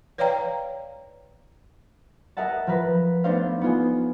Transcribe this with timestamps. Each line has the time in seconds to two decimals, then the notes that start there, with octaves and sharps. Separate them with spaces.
0.18 B4 C#5 D5 F5 G5 A#5
2.37 A#4 D#5 E5 F#5 A5
2.67 F3 A#4 B4
3.24 A3 B3 D4 D#4 C5 F5
3.61 B3 F4 G#4